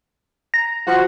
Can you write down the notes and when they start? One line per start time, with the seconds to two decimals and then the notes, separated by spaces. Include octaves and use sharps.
0.54 A#5
0.86 F3 F#4